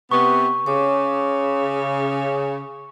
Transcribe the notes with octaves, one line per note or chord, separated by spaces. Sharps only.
C3 B3 C#6
C#3 C#5 D6